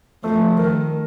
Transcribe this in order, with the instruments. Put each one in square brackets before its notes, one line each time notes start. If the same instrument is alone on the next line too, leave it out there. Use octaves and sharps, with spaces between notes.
[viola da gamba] F3 [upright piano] A3
[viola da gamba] D#3 [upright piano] A#4